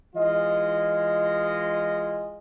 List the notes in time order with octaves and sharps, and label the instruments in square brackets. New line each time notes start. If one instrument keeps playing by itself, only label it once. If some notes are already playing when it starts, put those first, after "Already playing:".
[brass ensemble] E3 G#3 F4 D#5